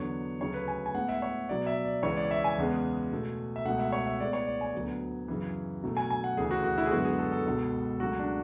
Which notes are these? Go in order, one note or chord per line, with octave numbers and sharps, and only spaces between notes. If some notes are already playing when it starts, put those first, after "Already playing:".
Already playing: E2 D3 F#3 B3 C#5
D2 C#3 F#3 A3 C#5
B4
G#5
G#5
A2 G#3 B3 F#5
E5
C#5
B2 F#3 B3 D5
E5
D5
C#2 C#3 E3 C#5
D5
E5
G#5
E2 C#3 G#3 B3
B2 A3
E5
C#2 B2 A3 F#5
E5
C#5
E5
A2 G#3 B3 D5
C#5
D5
G#5
D2 D3 F#3 B3
F#2 C#3 E3
B2 F#3 A3
G#5
G#5
F#5
D2 C#3 E3 A3 G#4
F#4
F#4
E4
G#4
F#2 D3 G#3 B3 F#4
G#4
A4
A4
C#2 B2 G#3 B3
C#2 C#3 F#3 A3 F#4
D4